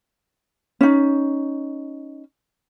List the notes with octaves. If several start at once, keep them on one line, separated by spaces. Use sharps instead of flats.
C#4 D#4